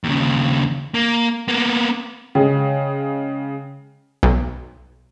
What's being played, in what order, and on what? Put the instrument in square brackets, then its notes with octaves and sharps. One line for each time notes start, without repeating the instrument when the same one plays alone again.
[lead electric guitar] D#2 C#3
A#3
A#3 B3
[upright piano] C#3 G#3 [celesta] G5
[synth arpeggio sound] B1